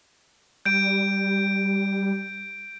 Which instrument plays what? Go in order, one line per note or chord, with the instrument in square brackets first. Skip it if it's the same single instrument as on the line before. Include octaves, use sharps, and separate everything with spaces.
[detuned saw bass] G3 [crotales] G6 D7